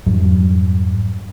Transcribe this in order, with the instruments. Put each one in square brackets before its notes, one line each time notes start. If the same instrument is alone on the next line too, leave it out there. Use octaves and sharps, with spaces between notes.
[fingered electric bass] F2 G#2 F#3 G3